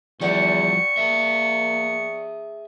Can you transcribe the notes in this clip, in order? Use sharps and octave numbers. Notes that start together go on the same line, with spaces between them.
E2 F3 G3 G4 D5 F#5 C#6
A#3 G#4 E5